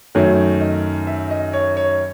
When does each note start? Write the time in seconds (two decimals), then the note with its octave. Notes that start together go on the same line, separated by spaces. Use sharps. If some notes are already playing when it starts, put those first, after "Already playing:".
0.15 F#2 D#3 F#3 A3 C#5
0.61 D#5
1.07 E5
1.30 D#5
1.53 C#5
1.77 C#5